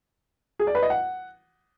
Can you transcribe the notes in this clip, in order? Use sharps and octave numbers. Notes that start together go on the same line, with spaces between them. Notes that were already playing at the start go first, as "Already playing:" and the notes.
G#4
D5
B4
D#5
F#5